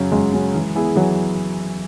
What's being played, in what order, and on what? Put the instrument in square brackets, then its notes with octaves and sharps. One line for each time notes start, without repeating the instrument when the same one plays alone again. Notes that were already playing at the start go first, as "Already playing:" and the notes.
Already playing: [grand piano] F#2 C#3 F#3 C#4
[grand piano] F#2 [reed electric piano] G#3
[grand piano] C#3 F#3 C#4
E3
B3 E4 G#4
[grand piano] E3 [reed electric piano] F#3